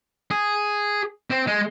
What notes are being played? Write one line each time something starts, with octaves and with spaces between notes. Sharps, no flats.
G#4
C4
G#3